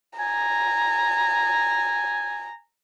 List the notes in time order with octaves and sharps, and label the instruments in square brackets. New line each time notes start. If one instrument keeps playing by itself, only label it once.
[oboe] G#5 [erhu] A#5